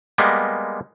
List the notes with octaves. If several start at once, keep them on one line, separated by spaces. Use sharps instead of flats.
G3 G#3 A#3 B3